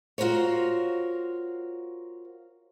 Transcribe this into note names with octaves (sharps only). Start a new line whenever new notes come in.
F4 F#4 A#4 C5 C#5